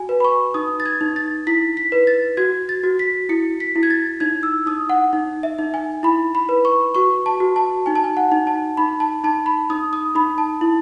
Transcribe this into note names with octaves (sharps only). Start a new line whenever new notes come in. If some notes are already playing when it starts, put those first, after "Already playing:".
Already playing: F#4 G#5
B4
B5
C#6
D#4 D#6
A6
G#6
D#4
A6
E4 B6
B6
B4
A6
F#4 G#6
A6
F#4
B6
E4 C#7
B6
E4
G#6
A6
D#4 G#6
E6
D#4 D#6
F#5
D#4
E5
D#4
G#5
E4 B5
B5
B4
C#6
F#4 C#6
A5
F#4
A5
D#4 G#5
A5
G#5
F#5
D#4
A5
D#4 B5
A5
D#4 A5
B5
D#4 D#6
D#6
D#4 B5
A5
E4